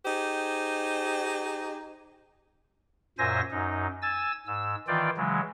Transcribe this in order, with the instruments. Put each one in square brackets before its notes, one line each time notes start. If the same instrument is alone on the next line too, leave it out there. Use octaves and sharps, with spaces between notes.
[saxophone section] D#4 G4 G#4 C5
[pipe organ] F#2 A#2 C5 E5 G#5 A#6
F#2 D#4
G#5 E6 A6
G#2 E6
D#3 E3 F4 D5 G5
C#3 E3 F#3 G#3